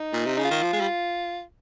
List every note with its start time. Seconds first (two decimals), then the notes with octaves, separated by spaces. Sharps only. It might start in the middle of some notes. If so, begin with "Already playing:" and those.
Already playing: D#4
0.13 A#2
0.26 C3
0.37 C#3 D#4
0.45 F4
0.51 D#3
0.63 F3
0.73 G#3
0.81 G3